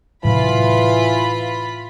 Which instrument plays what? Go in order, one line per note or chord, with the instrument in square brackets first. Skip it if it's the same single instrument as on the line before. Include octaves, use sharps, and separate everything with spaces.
[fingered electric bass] A2 C3 F#3 [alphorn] E3 [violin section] F4 B5